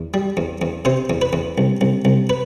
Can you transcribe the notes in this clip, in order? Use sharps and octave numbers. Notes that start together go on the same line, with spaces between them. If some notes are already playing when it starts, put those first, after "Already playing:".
Already playing: E2
G3
E2
E2
C3 C5
E2
B4
E2
C2
C2
C2
B4